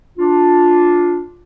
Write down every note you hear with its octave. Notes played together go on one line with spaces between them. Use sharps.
D4 F4